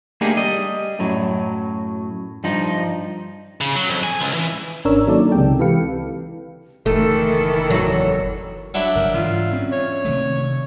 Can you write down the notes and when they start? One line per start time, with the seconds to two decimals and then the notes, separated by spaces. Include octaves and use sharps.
0.21 A3 A#3 D4 D#4 G4 G#4
0.37 G3 D#5
0.99 F#2 A2 F#3
2.44 G2 F3 D#4
3.61 C#3
3.76 F#3
3.89 F2
4.03 G#5
4.20 C#2
4.34 E3
4.85 G#1 C#4 D4 A#4 C#5 E6
5.07 D#3 F#3 A#3 D#4 A4 D5
5.32 C#2 C3 G#3 G5
5.59 E3 G4 A4 B4 F5 C#7
6.86 F#1 D#3 E3 A3 A4
7.70 E2 F#3
8.74 F#3 D4 E4
8.95 G1 G2 A#4
9.14 G#2 E3 F4
9.53 C4 C#4
9.72 C#5
10.05 C3 D#3 A3